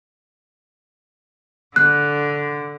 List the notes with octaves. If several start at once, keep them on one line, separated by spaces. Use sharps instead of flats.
D3 F#6